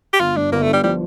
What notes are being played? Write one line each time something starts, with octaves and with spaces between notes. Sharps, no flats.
G4
G1 F4
G2 D4
G1 A#3
A3
G2
G3
F3 G3